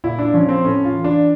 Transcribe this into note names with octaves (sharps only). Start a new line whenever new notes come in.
A#2 E4
D4
F3 C#4
C4
A2 C#4
F4
E3
D4